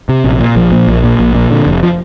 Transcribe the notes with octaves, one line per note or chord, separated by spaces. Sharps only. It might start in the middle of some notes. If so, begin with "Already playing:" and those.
C3
A#1
A#2
A#1 F3
A#2
A#1
A#2
A#1
A#2
D3
F1
F3